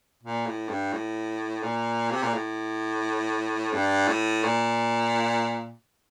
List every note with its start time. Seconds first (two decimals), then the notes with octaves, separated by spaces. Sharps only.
0.23 A#2
0.46 A2
0.69 G2
0.93 A2
1.63 A#2
2.11 C3
2.22 A#2
2.33 A2
3.73 G2
4.08 A2
4.44 A#2